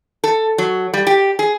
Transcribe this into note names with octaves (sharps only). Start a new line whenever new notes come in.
A4
F#3
G3
G4
G#4